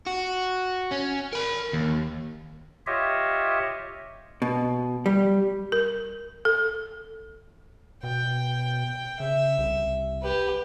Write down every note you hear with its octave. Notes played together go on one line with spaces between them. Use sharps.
F#4
C#4
A#4 B5
D#2
F4 G4 C#5 D#5 E5
B2
G3
A#4
A4
B2 G5
C#3 E5
C2
G4 B4